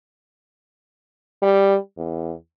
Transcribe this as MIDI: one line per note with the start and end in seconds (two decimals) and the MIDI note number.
1.42 1.76 55
1.98 2.33 40